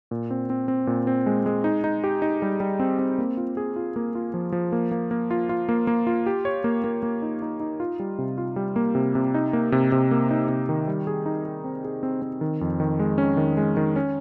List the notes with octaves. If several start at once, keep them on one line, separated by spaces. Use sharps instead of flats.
A#2
C4
C4
C4
A#2
C4
G#3
G#3
D#4
D#4
G4
D#4
G3
G3
C4
C4
A#3
F4
G#4
F4
A#3
F4
F3
F3
A#3
A#3
A#3
F4
F4
A#3
A#3
F4
G4
C#5
A#3
A#3
A#3
D#4
D#4
D#4
F4
G3
C3
F4
G3
A#3
C3
C3
D#4
A#3
C3
C3
A#3
D#4
C3
D#3
G3
G#4
D#4
G#4
C4
G#4
C4
C4
D#3
F2
D#3
G#3
C#4
D#3
G#3
D#3
C#4